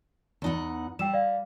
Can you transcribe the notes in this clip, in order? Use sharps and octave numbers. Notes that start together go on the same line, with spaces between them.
E2 D#4 F#5
G3 G5 E6 E7
D5 F5